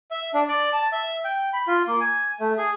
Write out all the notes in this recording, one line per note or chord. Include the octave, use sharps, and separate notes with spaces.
E5
D4
D5
A5
E5
G5
B5
F4
A#3
G#5
A3
G#4